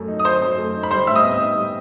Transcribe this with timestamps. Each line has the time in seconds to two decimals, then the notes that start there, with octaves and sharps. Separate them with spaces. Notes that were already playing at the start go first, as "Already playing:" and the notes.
Already playing: F#2 F#3 A3
0.08 D#4
0.20 D#6
0.25 F#3 C5 C6
0.41 F#2
0.58 A3
0.74 D#4
0.83 B5
0.91 G3 C5 C6
1.07 A2 E5 E6
1.16 D#5 D#6
1.24 B3
1.40 D#4
1.57 G3